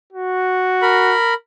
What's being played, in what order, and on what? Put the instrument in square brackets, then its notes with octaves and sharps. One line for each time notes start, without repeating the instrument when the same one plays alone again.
[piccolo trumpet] F#4
[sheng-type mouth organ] A#4 B5